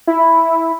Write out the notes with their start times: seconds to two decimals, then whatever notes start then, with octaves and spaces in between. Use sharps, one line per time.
0.07 E4